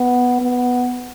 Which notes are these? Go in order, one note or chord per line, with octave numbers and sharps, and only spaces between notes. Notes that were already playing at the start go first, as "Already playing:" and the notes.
Already playing: B3
B3